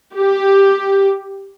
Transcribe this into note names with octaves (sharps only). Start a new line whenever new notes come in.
G4